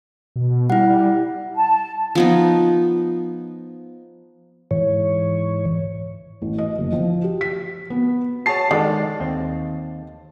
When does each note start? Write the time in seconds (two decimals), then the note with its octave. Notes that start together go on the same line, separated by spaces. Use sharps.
0.36 B2
0.70 G3 E4 F#5
1.55 A5
2.15 F3 B3 D#4
4.71 G#2 E3 C#5
6.42 A1
6.58 D#5
6.78 F#1
6.93 F3
7.24 G4
7.41 B6
7.90 B3
8.46 F#4 G#4 C#5 A5 C7
8.71 D3 D#3 G#3 D5
9.20 D#2 C4